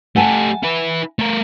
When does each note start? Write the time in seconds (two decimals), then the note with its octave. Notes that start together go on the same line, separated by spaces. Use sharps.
0.16 A3 G4 F#5 G#5 A5
0.63 E4 B4
1.19 A3 A#4